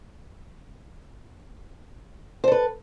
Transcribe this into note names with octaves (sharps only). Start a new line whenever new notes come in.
A4 B4 C5